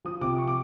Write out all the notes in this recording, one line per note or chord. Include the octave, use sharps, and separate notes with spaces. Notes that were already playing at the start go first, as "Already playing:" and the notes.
F3 D#6
C3 D6
C#6
D6